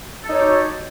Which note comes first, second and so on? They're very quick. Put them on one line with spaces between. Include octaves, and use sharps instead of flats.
A4 D#4 C#5 G4 F#4